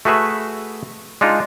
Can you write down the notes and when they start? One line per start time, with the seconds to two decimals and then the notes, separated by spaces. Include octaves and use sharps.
0.05 A3 F#4 G#4 B4 E5
1.21 G#3 D4 D#4 F4